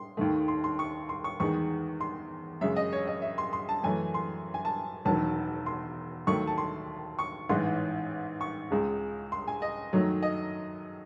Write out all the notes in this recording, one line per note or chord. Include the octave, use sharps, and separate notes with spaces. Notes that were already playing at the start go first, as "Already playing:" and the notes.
Already playing: C6
D#2 D#3 A3
C6
C6
C#6
C6
C#6
E2 D#3 G#3 C#6
C6
F#2 C#3 G#3 E5
D#5
C#5
D#5
E5
C6
C6
A5
F#2 E3 A3 G#5
C6
G#5
A5
E1 E2 D#3 F#3 A5
C6
D#2 D#3 F#3 A3 C#6
A5
C6
C#6
A1 G#2 E3 C6
C#6
C#2 C#3 G#3
C6
G#5
D#5
F#2 D#3 F#3 A3
D#5